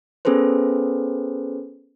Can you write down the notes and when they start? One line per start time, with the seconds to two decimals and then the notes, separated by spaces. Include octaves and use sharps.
0.25 B3 C#4 G#4 A4 B4 C5